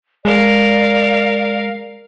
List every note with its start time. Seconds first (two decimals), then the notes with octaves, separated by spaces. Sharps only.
0.25 G#3 A#4 D5 F5